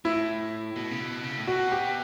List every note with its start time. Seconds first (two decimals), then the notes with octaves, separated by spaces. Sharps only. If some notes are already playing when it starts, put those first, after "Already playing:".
0.05 A2 E4
0.76 B2
0.91 C#3
1.00 B2
1.23 C#3
1.38 A2
1.47 B2 F#4
1.72 G4